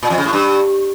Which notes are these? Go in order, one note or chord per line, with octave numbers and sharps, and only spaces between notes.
A#2
F2
C#3
A2
G2